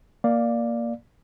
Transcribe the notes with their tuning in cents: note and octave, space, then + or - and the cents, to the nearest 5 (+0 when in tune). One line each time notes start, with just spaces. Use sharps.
A#3 +0 D5 +5 F5 +0